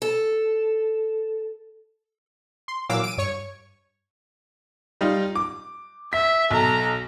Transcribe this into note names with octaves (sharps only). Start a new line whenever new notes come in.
A4
C6
A#2 E3 F#3 F5 D6 E6
D7 D#7
G2 C#5 C#6
G3 D#4 F4
D6
E5 B6
B1 A4 A#5